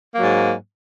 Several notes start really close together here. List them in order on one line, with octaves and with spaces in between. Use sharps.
A#3 F#3 G#2